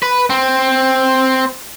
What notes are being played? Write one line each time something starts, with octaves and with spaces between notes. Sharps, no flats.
B4
C4